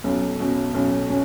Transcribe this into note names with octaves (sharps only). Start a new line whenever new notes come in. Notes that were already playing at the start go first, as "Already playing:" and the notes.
B1 C#4
B2 C#4
B1 C#4
C#4